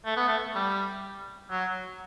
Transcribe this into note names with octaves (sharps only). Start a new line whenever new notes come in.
A3
B3
A3
G3
F#3